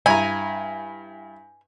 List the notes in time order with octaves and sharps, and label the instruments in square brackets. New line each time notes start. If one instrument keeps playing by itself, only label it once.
[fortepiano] G2 E4 A#5 [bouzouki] G#5